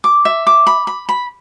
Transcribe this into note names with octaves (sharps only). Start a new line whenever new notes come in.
D6
E5
D6
B5
B5
B5